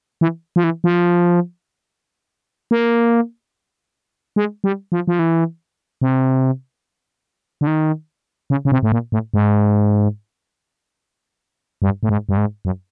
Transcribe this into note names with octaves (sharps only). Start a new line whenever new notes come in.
E3
F3
E3
F3
A#3
G#3
G3
F3
F3
E3
C3
D3
D#3
C#3
C#3
C3
A2
A#2
A2
G#2
G2
A2
G#2
G2
G#2
F#2